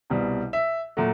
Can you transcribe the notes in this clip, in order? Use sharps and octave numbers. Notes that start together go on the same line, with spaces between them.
C2 B2 G3
E5
A#2 F#3 A3